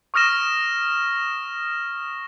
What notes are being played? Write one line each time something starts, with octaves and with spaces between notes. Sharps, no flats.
C#6 D#6 F6 A#6 E7